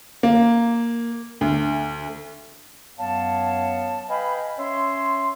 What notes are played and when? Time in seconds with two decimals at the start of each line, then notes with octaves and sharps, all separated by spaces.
0.23 A#3
1.41 D2
2.98 F#2 F#3 B3 C#5 F5 A5
4.09 B4 D#5 F5 G5 G#5 B5
4.58 C#4 C#5 E5 C6